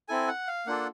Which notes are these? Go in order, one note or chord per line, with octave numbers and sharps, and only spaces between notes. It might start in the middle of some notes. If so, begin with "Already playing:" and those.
C4 E4 A4 G#5
F#5
F5
A#3 D4 F4 A4 F#5